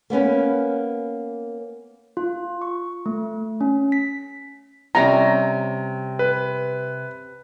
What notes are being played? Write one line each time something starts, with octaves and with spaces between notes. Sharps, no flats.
A#3 B3 C#4 B4
F4
C#6
A3
C#4
B6
C3 G3 C#4 A#5
B4